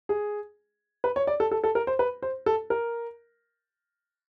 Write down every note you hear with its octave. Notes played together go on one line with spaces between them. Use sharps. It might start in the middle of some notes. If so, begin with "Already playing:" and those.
G#4
B4
C#5
D5
A4
A4
A4
A#4
C5
B4
C5
A4
A#4